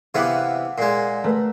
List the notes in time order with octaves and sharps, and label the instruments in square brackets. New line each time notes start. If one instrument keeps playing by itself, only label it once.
[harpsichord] C3 E3 B3 [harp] F5 F#5 D6
[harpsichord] A#2 G#3 [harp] C7
[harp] A3 A#4 B4